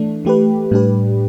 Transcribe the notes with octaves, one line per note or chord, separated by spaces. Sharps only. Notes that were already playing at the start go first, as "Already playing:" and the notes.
Already playing: E3 A3 D4
E3 A3 G4 B4
A2 G3 D4 G4 B4